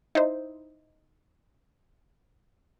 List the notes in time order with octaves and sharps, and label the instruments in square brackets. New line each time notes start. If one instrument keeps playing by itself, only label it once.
[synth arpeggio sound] D#4 E4 C5